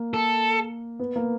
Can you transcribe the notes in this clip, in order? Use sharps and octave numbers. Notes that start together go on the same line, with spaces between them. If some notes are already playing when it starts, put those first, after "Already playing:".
Already playing: A#3
A4
B3
A#3